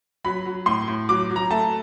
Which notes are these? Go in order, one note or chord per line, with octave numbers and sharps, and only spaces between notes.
F#3 B5
F#3
A2 C6
A2
F#3 D6
F#3
A#5
A3 A5